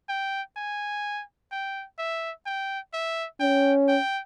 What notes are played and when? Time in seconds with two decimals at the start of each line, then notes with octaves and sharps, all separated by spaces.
0.09 G5
0.56 G#5
1.51 G5
1.98 E5
2.46 G5
2.93 E5
3.40 C#4 G5
3.88 G5